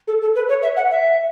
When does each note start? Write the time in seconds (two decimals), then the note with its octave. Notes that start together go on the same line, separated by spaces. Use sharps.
0.07 A4
0.21 A4
0.35 B4
0.48 C#5
0.62 E5
0.76 F#5
0.90 E5